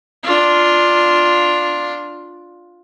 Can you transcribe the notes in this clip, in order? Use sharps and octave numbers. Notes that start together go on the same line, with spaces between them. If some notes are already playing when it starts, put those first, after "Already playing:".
D4 F4